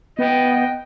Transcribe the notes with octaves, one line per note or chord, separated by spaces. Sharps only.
B3 D#5 G5